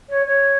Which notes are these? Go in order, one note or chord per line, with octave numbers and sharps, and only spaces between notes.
C#5
C#5